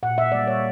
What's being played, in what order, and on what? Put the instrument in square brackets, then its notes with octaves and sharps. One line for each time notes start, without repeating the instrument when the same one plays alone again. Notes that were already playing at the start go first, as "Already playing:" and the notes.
[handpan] A#2 F#5
E5
G3 A#3 D5
C#5